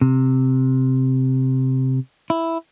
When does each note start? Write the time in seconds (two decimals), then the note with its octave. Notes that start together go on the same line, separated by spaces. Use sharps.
0.01 C3
2.30 E4